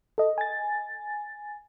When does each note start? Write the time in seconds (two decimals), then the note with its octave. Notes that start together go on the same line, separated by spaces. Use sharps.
0.18 A4 D#5
0.38 G#5 A6